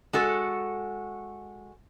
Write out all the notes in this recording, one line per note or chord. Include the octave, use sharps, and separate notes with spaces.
G#3 F#4 A4